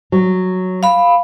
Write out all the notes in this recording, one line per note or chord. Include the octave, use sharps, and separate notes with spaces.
F#3
F5 B5